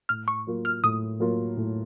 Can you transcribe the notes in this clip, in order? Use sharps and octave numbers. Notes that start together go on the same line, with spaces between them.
A2 F6
C#6
F#3 A#3 F4 A#4
F6
A2 D#6
F#3 A#3 F4 A#4
A2